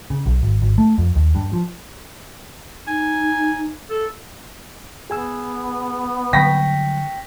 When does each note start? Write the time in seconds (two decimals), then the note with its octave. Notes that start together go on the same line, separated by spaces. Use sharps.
0.10 C#3
0.26 B1
0.43 G#1
0.62 G#1
0.78 A3
0.98 F2
1.16 D#2
1.35 G2
1.53 F3
2.88 D#4 G#5
3.90 A4
5.10 B3 G#4 G#5 E6
6.33 D3 F#3 G3 G5 C#6 A#6 B6